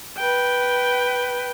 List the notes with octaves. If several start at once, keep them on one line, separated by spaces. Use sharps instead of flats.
B4 G5